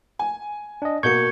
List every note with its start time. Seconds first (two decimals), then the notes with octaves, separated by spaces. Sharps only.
0.19 G#5
0.82 D4 D#5
1.03 B2 A#3 C#6 G6 G#6 C#7